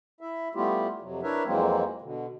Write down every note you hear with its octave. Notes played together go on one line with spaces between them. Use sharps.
E4 E5
G3 A3 B3 E4 F4 G4
F2 C3 F#3
D4 E4 A#4 B4 C#5 E5
F2 E3 F#3 G#3 A#3 C4
B2 D3